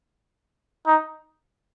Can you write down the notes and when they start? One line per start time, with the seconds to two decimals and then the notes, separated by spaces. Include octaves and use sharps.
0.87 D#4